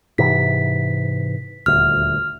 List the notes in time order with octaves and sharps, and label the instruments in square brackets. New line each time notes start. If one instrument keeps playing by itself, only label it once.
[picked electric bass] G#2 C3 E3 [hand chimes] B6
[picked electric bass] D#1 D2 [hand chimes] F6